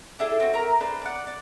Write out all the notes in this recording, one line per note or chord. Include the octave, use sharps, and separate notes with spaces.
D4 E4 G#4 A4
C4 F#4
A#4 E5 F#5 A#5
D4 G#4 B4 C5
D5 F#5
D5